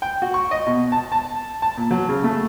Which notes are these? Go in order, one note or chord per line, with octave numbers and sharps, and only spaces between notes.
G5
F#4
C#6
D#5
B2
A5
A5
A5
A#2
F#3
C#3
A3